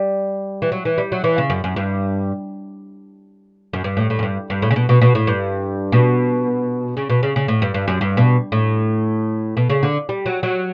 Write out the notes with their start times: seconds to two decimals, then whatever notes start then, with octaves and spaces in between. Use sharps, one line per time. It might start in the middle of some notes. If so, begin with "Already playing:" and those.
Already playing: G3
0.62 E3
0.72 F#3
0.85 E3
0.98 G3
1.12 F#3
1.24 E3
1.38 C#3
1.50 F#2
1.64 F#2
1.76 G2
3.73 F#2
3.84 G2
3.97 A2
4.10 A2
4.19 F#2
4.23 G2
4.50 G2
4.62 A2
4.71 C#3
4.76 B2
4.89 B2
5.01 B2
5.15 A2
5.27 G2
5.92 B2
6.97 C#3
7.10 B2
7.23 C#3
7.36 C#3
7.48 A2
7.62 G2
7.74 G2
7.88 F#2
8.01 G2
8.17 B2
8.52 A2
9.57 B2
9.70 C#3
9.83 D3
10.09 G3
10.26 F#3
10.43 F#3